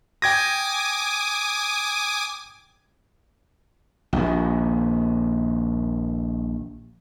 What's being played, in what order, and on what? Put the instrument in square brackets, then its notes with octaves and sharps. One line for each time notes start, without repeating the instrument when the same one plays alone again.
[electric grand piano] G5 G#6 A#6 [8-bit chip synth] G#5 D6 D#6
[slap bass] A#1 D#2